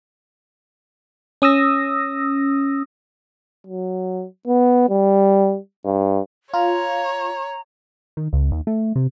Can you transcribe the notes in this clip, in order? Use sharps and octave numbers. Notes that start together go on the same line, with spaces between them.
C#4 D#6 E6 A#6
F#3
B3
G3
G2
F4 C#5 A#5
D#3
C#2
D#2
A3
C3